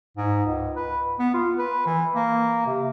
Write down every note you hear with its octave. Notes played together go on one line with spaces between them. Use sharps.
G#2
C#2
B4
B3
F4
B4
E3
A#3
C3